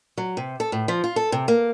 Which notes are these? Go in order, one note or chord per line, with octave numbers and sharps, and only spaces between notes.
F#3
C3
A4
A2
F3
F4
A4
C3
A#3